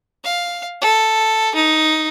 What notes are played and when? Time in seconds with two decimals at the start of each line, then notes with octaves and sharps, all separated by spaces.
0.24 F5
0.81 A4
1.55 D#4